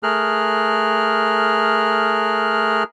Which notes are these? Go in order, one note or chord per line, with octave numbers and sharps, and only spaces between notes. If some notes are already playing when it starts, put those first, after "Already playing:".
A3 G#4 A#4 F6 F#6